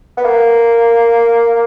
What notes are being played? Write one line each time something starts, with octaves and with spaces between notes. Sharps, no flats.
B3
A#3